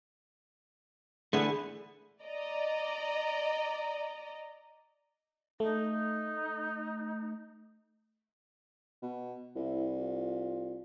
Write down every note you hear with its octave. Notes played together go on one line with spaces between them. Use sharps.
D3 E3 A3 B3 G#4
D5 D#5 A#5
A3 D#4
B2
C2 E4
F4